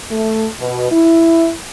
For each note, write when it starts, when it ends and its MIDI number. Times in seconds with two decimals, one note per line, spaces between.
0.11 0.46 57
0.60 0.87 47
0.91 1.51 64